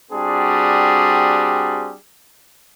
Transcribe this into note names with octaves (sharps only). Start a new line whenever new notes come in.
G3 C4 D4 F#4 G#4